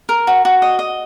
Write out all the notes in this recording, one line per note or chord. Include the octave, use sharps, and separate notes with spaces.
A#4
F#4
F#4
D#5
D#5